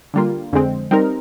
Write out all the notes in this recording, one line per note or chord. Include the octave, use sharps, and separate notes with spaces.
D3 G3 A#3 F4
F2 D3 G#3 C4
G3 C4 D#4 A#4